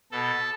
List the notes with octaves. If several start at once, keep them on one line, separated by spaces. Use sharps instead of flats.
B2 A4